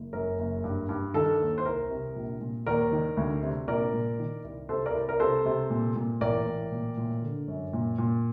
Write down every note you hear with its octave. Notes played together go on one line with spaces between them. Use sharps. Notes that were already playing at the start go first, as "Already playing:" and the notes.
Already playing: F#1
F#2 A#4
F#1
G2
G2
D#3 A4
D#2
C5
C2 A#4
C3
A#1
A#2
D#2 A#4 D5
D#3
D2
C3
A#1 A#4 D5
A#2
D#3
C2
C3 A4 C5
A#4 D5
C2
A#4
C3 A4 C5
C3
A#2
A#2
A1 A#4 D5
A1
A#2
A#2
D3
F#2
A#2
A#2